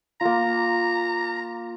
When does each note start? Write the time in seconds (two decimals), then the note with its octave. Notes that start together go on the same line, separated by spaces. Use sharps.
0.21 A#3 F4 A#5